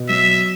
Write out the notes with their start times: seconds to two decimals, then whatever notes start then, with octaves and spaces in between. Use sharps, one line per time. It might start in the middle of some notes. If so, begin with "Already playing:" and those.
Already playing: B2
0.08 F#3 E5